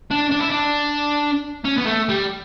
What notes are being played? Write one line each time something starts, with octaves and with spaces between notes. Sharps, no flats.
D4
D4
E4
D4
C#4
B3
A3
G3